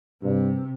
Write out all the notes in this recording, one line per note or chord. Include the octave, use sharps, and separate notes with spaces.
G2 C3